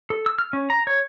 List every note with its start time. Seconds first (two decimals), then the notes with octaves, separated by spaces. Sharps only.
0.10 A4
0.26 E6
0.38 F6
0.53 C#4
0.70 A#5
0.87 C#5